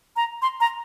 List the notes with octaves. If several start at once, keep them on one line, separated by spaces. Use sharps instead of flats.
A#5
C6
A#5